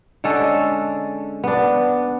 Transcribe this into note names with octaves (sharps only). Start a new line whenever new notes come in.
D3 G#3 C#4 A4
B3 D4